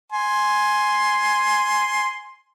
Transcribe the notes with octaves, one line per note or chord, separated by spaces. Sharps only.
G#5 C6